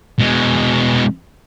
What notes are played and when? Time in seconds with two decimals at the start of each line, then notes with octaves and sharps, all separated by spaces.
0.19 B2 G#3